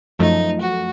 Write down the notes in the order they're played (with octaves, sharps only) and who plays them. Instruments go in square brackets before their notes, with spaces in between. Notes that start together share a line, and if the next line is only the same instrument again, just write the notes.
[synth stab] F#2 F3 A3 [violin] D#4
[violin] F#4